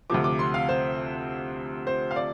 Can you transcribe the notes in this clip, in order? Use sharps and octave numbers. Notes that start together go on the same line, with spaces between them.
D2 C3 F3 D6
D6
C6
F5
C5
C5
F5
D5